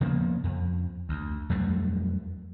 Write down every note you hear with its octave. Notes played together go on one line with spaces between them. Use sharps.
C#3 F3 A#3 B3
F2
D2
F2 F#3 G3 A3